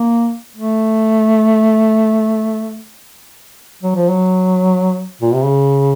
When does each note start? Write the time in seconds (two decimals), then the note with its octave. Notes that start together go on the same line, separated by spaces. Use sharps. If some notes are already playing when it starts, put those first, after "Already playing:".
Already playing: A#3
0.56 A3
3.83 F#3
3.95 F3
4.08 F#3
5.21 A#2
5.34 C3
5.45 C#3